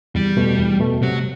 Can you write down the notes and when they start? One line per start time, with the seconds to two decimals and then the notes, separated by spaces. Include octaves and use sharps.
0.15 E2 G3
0.37 B2 A3
0.58 E2
0.80 B2 A3
1.02 C3 F#3